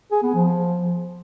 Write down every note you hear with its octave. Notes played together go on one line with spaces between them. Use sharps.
G#4
B3
F3